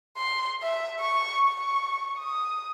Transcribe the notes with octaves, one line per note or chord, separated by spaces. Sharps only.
C6
E5
C#6
C#6
D#6